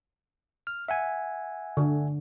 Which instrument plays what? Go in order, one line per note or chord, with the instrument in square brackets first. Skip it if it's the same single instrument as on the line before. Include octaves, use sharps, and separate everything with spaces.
[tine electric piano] F6
E5 F#5 G#5
[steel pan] D3